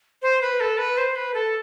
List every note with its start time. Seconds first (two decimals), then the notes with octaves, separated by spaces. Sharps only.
0.22 C5
0.41 B4
0.60 A4
0.78 B4
0.97 C5
1.16 B4
1.34 A4